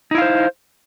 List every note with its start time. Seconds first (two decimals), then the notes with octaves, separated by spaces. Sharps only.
0.11 D#4
0.15 E4
0.18 F5
0.22 C5